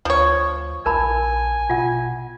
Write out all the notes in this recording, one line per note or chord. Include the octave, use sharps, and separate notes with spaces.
D2 F3 C#5
A#1 A#4 G#5 A5 B5
B2 F4 F#5